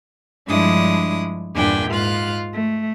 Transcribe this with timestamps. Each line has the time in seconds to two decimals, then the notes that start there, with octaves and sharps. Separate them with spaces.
0.47 G2 F3 G#3 D4 E4 D#6
1.55 E2 G2 A#2 D4 G5 G#5
1.90 G#2 F4 F5 F#6
2.54 A3